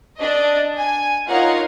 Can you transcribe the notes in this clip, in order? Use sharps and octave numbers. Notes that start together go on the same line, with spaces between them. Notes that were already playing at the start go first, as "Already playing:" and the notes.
D4 D#5
G#5
D#4 F4 A#4 C#5 F5 F#5